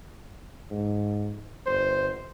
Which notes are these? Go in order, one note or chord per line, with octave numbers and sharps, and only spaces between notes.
G#2
G1 C5